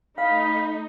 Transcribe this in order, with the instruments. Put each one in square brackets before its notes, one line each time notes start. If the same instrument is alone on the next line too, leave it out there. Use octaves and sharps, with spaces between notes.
[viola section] A3 D#4 [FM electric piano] F5 [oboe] B5